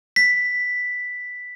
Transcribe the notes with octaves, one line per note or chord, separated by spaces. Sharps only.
B6